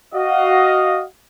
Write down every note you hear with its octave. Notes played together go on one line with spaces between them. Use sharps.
F#4 D#5 F5